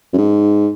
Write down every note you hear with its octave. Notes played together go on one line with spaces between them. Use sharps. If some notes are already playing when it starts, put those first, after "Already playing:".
F#2
G#2